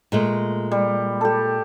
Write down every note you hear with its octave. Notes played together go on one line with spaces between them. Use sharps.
A#2 G#3 A3
G3
G4 A4